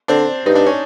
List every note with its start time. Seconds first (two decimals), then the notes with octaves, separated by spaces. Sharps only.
0.08 D3 C4 D4
0.46 G2 D#4
0.55 D4
0.66 C#4